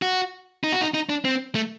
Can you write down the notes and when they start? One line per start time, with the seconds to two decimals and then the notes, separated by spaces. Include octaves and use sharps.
0.02 F#4
0.64 D#4
0.72 F#4
0.82 D#4
0.94 D#4
1.09 D4
1.25 C4
1.55 A3